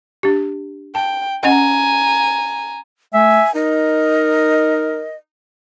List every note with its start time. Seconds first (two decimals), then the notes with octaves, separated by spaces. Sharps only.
0.23 D4 G4
0.95 G5 A5
1.43 C#4 D#5 F#5 G#5 A#5
3.14 A3 E5 G#5
3.55 D#4 A#4 D#5